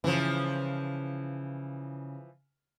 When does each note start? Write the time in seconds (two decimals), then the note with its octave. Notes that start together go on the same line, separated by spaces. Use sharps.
0.04 C#3 E3 F3